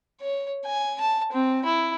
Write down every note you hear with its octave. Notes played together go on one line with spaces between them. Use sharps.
C#5
G#5
A5
C4
E4